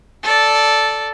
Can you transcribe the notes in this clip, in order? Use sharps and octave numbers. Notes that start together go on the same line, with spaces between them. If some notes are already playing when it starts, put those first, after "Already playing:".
A4 D5